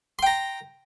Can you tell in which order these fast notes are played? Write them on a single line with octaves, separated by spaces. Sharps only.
C6 G5 A#5